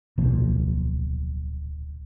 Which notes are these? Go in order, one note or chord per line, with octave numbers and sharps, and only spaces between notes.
D1 B1 A#2 F3